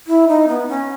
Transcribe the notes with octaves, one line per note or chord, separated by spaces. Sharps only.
E4
D#4
B3
C#4